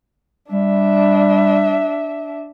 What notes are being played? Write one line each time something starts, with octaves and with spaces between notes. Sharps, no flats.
G3 D4 E5